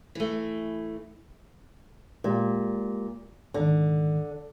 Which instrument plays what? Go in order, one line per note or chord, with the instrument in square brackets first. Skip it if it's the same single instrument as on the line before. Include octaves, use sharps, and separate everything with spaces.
[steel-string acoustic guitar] E3 A3
[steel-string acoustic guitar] A#2 [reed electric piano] G#3 G4
[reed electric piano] C#2 G#2 D#3 [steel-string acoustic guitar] D3